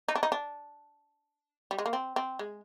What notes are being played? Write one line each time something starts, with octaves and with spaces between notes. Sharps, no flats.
D#4
D4
D#4
D4
G3
G#3
A#3
C4
C4
G#3